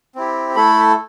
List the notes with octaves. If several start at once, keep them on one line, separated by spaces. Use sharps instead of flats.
C4 E4 G4
A3 E4 A4 B5